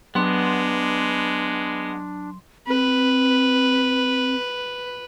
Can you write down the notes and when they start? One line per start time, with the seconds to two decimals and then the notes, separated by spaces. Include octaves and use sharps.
0.15 F#3 G#3 B3 D4 C6
2.67 C4 B4